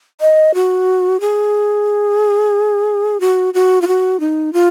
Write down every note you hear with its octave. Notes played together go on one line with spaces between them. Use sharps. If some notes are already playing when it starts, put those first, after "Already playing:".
D#5
F#4
G#4
F#4
F#4
F4
F#4
D#4
F4